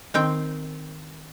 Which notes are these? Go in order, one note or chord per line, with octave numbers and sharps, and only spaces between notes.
D#3 C4 G5